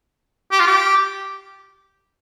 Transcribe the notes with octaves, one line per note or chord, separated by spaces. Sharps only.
G4
F4
G4